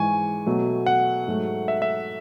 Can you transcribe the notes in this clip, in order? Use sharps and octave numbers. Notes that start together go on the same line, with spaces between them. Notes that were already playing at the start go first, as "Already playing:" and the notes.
Already playing: G#2 E3 G#3 G#5 C#6
B2 F#3 A3
F#5
G#2 F#3 A3
E5
E5